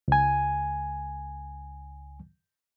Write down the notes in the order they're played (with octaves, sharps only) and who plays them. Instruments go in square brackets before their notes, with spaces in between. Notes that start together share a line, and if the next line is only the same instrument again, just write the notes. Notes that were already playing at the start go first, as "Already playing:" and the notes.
[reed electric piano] C#2 G#5